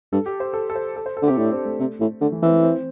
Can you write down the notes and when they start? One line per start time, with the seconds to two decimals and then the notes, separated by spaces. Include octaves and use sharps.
0.12 G2 A4
0.26 G4
0.40 C5
0.53 A4
0.70 A4
0.75 C5
0.96 A4
1.06 C5
1.17 A4
1.22 D3
1.27 G4
1.30 C3
1.37 A2 D4
1.52 C4
1.65 A3
1.79 C3
2.00 A2
2.21 D3 A3
2.32 E3
2.43 E3 C4
2.52 A3
2.63 C4